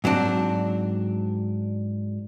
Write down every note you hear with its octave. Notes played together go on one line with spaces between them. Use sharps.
G#2 F#3 C4 D4